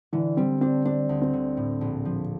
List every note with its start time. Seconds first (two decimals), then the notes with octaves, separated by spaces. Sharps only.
0.13 D3 E3
0.37 G3 C4
0.61 C4 D4
0.85 C4 D4
1.09 D2
1.22 C4
1.33 D3
1.57 A2
1.81 A#1
2.05 F3